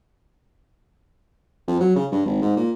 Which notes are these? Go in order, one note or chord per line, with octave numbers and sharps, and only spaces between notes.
F2
F#3
C#3
G2
G#1
G#2
A#2